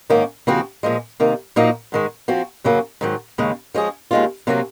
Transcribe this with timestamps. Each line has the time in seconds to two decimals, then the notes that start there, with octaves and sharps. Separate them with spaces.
0.10 G#2 D#3 A#3 C#4
0.47 D#2 C#3 F3 C4 F#4
0.83 A#2 F3 G#3
1.20 C3 D#3 A#3
1.56 A#2 F3 A#3 D#4 F#4
1.92 G#2 D#3 G#3
2.28 F3 C4 F#4
2.64 F#2 C#3 F#3 A#3 C#4
3.01 G#2 D#3 F#3
3.38 D#2 C#3 G#3
3.74 F3 G#3 C#4 G#4
4.11 D#2 D#3 G#3 C#4 F4
4.47 C3 F#3 A#3 C#4 F#4